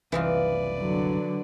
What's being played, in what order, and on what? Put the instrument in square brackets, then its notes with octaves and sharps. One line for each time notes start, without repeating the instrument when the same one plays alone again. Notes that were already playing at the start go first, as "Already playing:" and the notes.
[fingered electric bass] F#1 C2 [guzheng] E3 D#4 F4 [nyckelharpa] B4 D5
[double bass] D3 F#3